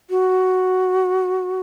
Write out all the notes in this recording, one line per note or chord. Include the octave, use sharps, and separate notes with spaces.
F#4